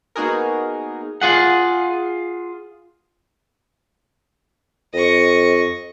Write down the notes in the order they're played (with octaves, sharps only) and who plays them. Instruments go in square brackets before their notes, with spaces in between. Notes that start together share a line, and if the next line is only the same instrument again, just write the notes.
[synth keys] A#3 B3 D#4 F#4 G#4 A#4
[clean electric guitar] F4 G#4 F#5
[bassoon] F2 [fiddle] D#5 C#6